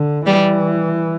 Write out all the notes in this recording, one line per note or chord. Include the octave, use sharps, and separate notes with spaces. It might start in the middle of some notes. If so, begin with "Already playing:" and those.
Already playing: D3
E3 G3